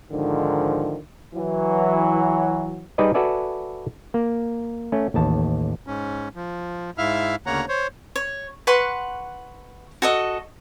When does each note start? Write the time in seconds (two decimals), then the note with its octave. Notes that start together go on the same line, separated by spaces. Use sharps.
0.11 G#2 D3 D#3 F3
1.35 E3 F#3
2.98 G3 D#4 G#4 B4 D5 D#5
3.14 F#4 A4 B4 D5 E5 G#5
4.14 A#3
4.92 A3 C#4
5.14 A1 D#2 A5
5.87 G#2 C#4
6.36 F3
6.98 G#2 E4 E5 F5 F6
7.46 D2 C#3 A#3 C#5 F#5 A#5
7.69 C5 C#5
8.16 C#5
8.67 B4 F#5 C6 C#6
10.02 F#4 A4 D#5